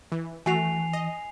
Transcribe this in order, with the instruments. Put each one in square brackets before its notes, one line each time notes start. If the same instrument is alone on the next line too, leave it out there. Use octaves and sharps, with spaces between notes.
[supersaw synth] E3
[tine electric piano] E3 [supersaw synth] A3 F#4 [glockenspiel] G#5 C7 F7
[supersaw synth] D#5